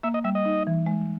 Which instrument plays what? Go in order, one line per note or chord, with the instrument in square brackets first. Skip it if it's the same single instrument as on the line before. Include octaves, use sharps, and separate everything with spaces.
[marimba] A#3 [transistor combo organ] E5
[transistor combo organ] D#5
[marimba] G3 [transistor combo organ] E5
[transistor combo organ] D#5
[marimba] D#4
E3
G#3